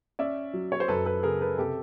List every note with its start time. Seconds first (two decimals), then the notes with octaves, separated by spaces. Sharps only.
0.19 C#4 D5 E5
0.53 F#3
0.72 C#5
0.80 C5
0.88 F#2 A4 B4
1.06 A4 B4
1.23 C#3 G#4 A#4
1.41 A4 B4
1.58 C3 G4 A4